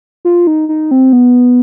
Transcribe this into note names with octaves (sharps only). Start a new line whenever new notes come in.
F4
D#4
D#4
C4
B3